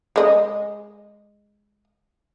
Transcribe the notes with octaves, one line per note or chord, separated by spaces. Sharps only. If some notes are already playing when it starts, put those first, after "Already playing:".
G#3 D#5